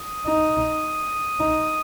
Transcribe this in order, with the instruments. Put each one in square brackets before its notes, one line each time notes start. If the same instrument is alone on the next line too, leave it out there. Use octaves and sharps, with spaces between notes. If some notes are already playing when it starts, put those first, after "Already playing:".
Already playing: [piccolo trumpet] D#6
[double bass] D#4
D#4